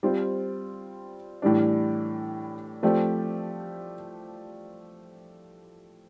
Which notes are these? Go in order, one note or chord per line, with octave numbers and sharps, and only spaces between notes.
G3 C4 F4 C5
A2 E3 G3 D4
F3 A3 C4 G4 D5